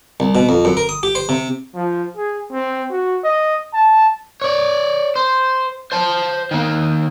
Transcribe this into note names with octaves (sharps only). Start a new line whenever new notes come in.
C2
B2
F2
F#2
A#4
D#6
G4
C5
C3
F3
G#4
C4
F#4
D#5
A5
C#5 D5
C5
C5 A5
D#3 A#3